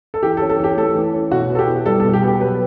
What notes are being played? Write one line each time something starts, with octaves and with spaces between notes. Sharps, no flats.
A4
E3 G4
A4
C#4
A4
E3 G4
A3 A4
E3
C#4
B2 F#4
B3
A4
G4
E4
G3 A4
A4
B2
G4
B3
G4
F#3 B4